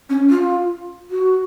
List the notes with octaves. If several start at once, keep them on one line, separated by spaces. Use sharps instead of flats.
C#4
F4
F#4